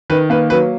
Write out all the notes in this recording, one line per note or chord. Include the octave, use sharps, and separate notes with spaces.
D#3 B4
A#3 B4
F#3 B4